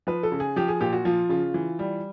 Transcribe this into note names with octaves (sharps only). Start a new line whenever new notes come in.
F3 B4
A4
C#3
G#4
F3 G4
G#4
A#2 G4
F#4
F3 F4
C#3 F4
E3
G3